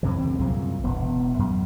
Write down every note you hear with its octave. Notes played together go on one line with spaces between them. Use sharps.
F2 C3 E3
D2 C4
C2 F#2 A#2 C#3
E1 B3
F#2